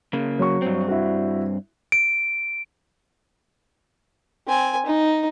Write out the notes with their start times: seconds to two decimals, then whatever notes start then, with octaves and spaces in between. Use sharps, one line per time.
0.13 C#3 A#3
0.39 F#3 C#6
0.62 G2 C4
0.88 E4 F#4
1.92 D7
4.47 C4 G#5
4.86 D#4